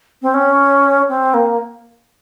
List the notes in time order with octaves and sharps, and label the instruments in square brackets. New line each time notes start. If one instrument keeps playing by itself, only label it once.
[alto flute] C4
C#4
C4
A#3